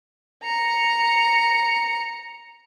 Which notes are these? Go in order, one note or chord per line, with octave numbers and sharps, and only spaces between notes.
A#5 C#7